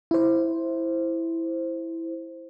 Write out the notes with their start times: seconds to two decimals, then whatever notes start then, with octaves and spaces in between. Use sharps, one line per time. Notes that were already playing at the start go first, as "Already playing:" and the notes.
0.11 E4 C5